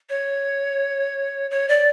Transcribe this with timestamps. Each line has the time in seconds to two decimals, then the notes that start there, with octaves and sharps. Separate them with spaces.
0.10 C#5
1.51 C#5
1.69 D5